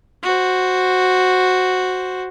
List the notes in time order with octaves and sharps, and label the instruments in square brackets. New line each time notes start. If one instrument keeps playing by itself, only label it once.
[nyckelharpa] F#4 C5